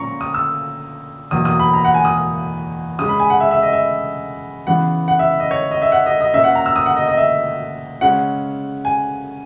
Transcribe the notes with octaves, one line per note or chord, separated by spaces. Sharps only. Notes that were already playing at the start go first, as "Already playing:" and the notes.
Already playing: A#2 F#3 C#4 A#5 C#6
D#6
E6
E2 B2 F#3 A#3 D#6
D#6
B5
A#5
F#5
G#5
D#6
C#3 G#3 C#4 D#6
B5
G#5
F#5
E5
E5
D#5
E5
C#3 E3 B3 F#5
F#5
E5
D#5
C#5
D#5
E5
F#5
D#5
D#5
A#2 A#3 C#4 E5
F#5
A#5
E6
D#6
F#5
D#5
D#5
E5
C#3 G#3 C#4 F#5
G#5